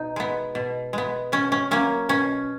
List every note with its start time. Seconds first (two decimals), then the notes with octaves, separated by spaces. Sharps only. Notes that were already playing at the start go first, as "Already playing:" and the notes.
Already playing: B2 D#4
0.16 G#3 B3
0.55 B2
0.93 G#3 B3
1.32 B2 C#4
1.52 C#4
1.71 F#3 A#3 C#4
2.09 B2 C#4